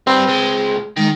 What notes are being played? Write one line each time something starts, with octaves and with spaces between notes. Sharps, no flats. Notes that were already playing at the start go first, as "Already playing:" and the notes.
G3 C4 B4
C#2 G#3
D#3 G#3